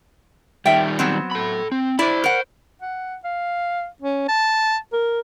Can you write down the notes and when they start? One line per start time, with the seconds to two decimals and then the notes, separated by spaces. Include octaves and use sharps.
0.66 D#3 G3 E5 G5
0.99 F#3 B3 C4
1.31 A4 B5
1.72 C4
1.99 E4 C5 D5 B5
2.24 A#4 F#5
2.82 F#5
3.24 F5
4.02 C#4
4.28 A5
4.93 A#4